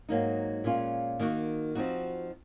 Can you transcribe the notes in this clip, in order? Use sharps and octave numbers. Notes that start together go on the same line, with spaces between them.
G#2 F#3 A#3 D#4
A#2 G#3 C#4 F4
D#3 A#3 D#4 F#4
F3 C4 D#4 F#4